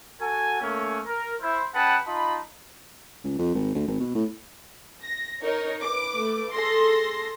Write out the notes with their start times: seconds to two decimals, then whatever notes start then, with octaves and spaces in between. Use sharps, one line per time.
0.20 F#4 A4 G#5
0.61 A3 A#3 C#4
1.06 A#4
1.41 E4 C5
1.74 C#4 G#4 B4 F#5 G5 A5
2.06 D#4 F4 D#5 A5 B5
3.24 C#2
3.38 F2
3.55 G#1
3.75 D2
3.88 G#1
4.00 B2
4.15 A2
5.04 A#6
5.43 D#4 A#4 C#5
5.83 B4 D6
6.16 A3
6.53 G#4 A4 C6 A#6